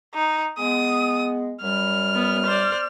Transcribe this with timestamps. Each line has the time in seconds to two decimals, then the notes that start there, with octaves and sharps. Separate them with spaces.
0.15 D#4
0.58 G#3 B3 D#6
1.62 F#2 G3 F6
2.15 B3
2.46 C5 D5